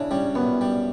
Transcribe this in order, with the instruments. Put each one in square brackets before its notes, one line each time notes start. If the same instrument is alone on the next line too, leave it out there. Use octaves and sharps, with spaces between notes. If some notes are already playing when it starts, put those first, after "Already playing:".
Already playing: [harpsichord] C#3 [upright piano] D4 E4
[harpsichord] G3 [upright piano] C#4
[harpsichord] F#2 [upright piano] B3
[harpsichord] G3